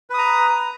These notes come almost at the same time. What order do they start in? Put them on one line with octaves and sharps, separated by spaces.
B4 D#6 A#5